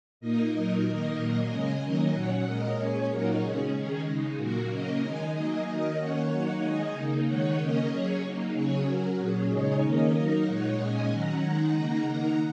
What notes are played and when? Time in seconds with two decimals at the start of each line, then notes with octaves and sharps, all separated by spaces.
0.20 A#2 A#3 D#4 A#4 D#5
0.52 A#2 F#3 D#4
0.84 D#3 A#3 D#4 A#4 D#5
1.17 A#2 F#3 A#3
1.48 C#3 G#3 C#4 D#5 G#5
1.80 D#3 F#3 A#3 C#4 A#4 D#5
2.13 A#2 F#3 C#4 C#5 F#5
2.45 A#2 G#3 C#4 A#4 D#5
2.77 A#2 G#3 C#4 G#4 C#5
3.09 A#2 F#3 A#3 D#4 F#4 A#4
3.41 C#3 G#3 C#4 G#4
3.73 D#3 G#3 C#4 G#4
4.05 C#3 G#3 D#4
4.37 A#2 F#3 A#3 F#4 A#4
4.69 C#3 F#3 A#3 C#4 A#4 D#5
5.01 D#3 G#3 D#4 D#5 G#5
5.33 F#3 A#3 D#4 D#5 G#5
5.65 D#3 F#3 D#4 A#4 D#5
5.97 D#3 A#3 C#4 C#5 F#5
6.29 F#3 A#3 D#4
6.61 D#3 G#3 D#4 D#5 G#5
6.93 C#3 A#3 D#4
7.25 D#3 G#3 D#4 C#5 F#5
7.57 C#3 A#3 C#4 A#4 D#5
7.89 F#3 C#4 G#4 C#5
8.21 F#3 A#3 D#4
8.53 C#3 F#3 C#4 G#4 C#5
8.86 F#3 C#4 F#4 A#4
9.17 A#2 F#3 C#4 G#4
9.49 C#3 G#3 D#4 G#4 C#5
9.81 D#3 A#3 C#4 A#4 D#5
10.13 F#3 A#3 D#4
10.46 A#2 G#3 D#4 C#5 F#5
10.78 A#2 G#3 C#4 D#5 G#5
11.09 D#3 F#3 C#4 F#5 A#5
11.42 D#3 G#3 D#4
11.74 C#3 A#3 D#4
12.06 D#3 A#3 D#4